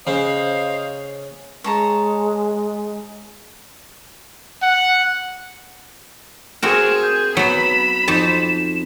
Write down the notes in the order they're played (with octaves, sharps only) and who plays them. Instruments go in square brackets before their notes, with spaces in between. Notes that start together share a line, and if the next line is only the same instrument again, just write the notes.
[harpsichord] C#3 [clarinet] C5 [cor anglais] D#5 [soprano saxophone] F5
[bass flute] G#3 [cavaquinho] C#5 A5 A#5
[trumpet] F#5
[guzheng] C4 F#4 A#4 [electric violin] G#4 [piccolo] E7
[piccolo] G6
[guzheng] F#3 B3 [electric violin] B5 [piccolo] E7
[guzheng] F2 D#4 A5